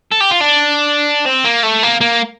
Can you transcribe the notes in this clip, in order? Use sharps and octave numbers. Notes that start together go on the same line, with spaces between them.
A4
G4
F4
D4
C4
A#3
A3
A#3
A#3